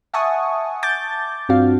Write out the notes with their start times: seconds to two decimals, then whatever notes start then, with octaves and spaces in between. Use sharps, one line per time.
0.14 E5 F#5 G#5 A5 C#6 D#6
0.83 A5 D6 G6 A6
1.49 G2 C4 D4 F4 F#4 F5